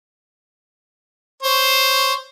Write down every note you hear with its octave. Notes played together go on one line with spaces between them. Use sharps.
C5 C#5